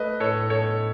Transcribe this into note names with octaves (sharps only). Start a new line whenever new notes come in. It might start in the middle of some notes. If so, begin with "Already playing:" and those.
Already playing: A3 B4 D#5
A2 A4 C#5
A2 A4 C#5